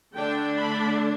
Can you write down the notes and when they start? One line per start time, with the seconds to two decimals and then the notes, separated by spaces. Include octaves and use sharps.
0.14 D3 A3 D4 G5
0.56 B5